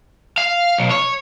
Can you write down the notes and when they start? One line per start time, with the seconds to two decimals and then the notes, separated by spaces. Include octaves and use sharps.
0.38 F5
0.78 B1
0.91 C#5